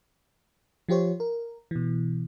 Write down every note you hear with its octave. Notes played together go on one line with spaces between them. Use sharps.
F3 F4 G4 C5 C#5
A#4
B2 E3